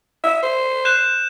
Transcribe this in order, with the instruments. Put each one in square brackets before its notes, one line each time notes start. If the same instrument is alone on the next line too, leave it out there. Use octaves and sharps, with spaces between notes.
[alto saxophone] E5
C5
[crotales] F#6 G6 E7